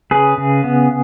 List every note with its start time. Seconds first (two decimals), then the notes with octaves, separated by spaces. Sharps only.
0.11 C#3 G#4 B4
0.38 C#3
0.64 B3